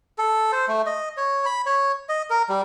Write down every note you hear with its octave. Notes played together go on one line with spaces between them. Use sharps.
A4
C5
A3
D#5
C#5
B5
C#5
D#5
A#4
G3